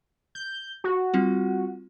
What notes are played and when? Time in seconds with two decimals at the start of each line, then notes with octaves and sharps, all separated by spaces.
0.35 G6
0.84 F#4
1.14 G3 C4 F4